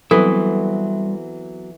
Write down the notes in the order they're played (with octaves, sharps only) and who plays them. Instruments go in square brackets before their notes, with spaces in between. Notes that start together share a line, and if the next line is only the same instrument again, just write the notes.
[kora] E3 [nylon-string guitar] F#3 B3 C4 [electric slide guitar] G3 E5 [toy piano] A4